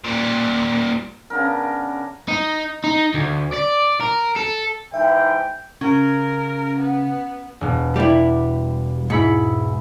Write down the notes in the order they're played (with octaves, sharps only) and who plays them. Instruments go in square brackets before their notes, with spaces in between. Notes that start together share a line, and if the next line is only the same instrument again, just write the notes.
[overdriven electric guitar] A#2 G3
[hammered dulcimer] C#3 B3 D4 A#4
[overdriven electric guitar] D#4
D#4
D2
D5
A#4
A4
[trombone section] G#2 E3 [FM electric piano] E5 [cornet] G5
[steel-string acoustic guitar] C#3 [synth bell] C#4 [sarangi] A#4
[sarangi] B3
[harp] E1 B2
[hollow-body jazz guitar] G3 E4 [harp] G4
[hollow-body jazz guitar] G#2 [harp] E4 B5 C#7